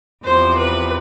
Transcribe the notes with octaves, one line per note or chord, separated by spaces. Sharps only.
E2 C3 F3 C5
B4